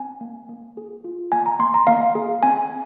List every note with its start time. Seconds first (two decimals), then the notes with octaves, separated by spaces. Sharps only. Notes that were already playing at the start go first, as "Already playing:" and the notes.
Already playing: C4 G#5
0.21 A#3
0.49 A#3
0.77 G#4
1.04 F4
1.32 A#3 G#5
1.46 A#5
1.59 A#3 C6
1.74 A#5
1.87 A#3 F5
2.15 G#4
2.43 C4 G#5